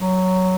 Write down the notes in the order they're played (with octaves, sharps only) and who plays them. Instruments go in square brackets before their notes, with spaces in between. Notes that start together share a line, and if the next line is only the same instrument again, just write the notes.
[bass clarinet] F#3